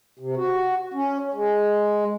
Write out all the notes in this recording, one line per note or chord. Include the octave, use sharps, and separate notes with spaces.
C3
F#4
C#4
G#3